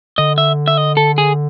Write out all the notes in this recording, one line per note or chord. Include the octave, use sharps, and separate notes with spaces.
D3 D#5
E5
E5
D#5
A4
G#4